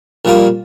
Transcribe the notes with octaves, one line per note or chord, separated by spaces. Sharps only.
A#1 A#2 G3 A#3 F4